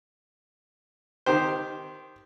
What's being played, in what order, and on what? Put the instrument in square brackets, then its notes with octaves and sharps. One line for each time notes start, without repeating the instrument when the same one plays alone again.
[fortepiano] D#3 G4 C5